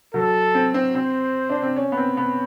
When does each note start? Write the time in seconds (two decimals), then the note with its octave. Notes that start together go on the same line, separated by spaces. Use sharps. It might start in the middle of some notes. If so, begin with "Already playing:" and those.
0.14 F#3 A4
0.55 C4
0.74 C4
0.95 C4 C5
1.50 D4
1.63 C4
1.76 C#4
1.92 B3
1.97 C4
2.17 B3